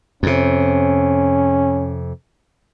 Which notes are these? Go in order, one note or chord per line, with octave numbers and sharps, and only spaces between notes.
F2 C3 C#4